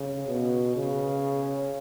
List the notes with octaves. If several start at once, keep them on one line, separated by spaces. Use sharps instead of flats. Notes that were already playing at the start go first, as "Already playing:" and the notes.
Already playing: C#3
B2
C#3